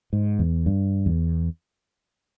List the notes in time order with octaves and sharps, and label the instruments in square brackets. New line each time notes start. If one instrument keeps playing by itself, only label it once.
[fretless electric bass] G#2
E2
G2
E2